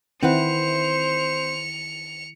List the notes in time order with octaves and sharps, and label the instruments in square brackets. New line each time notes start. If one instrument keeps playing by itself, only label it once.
[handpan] D#3 E4 [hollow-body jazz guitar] C4 B4 F#5 [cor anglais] C5 [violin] C#7 F7